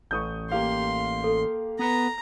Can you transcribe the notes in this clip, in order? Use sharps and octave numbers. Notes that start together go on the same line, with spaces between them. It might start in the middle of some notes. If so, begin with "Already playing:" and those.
A1 C#6 D#6 G6
A#3 G4 F5 C6
A4
B3 A#5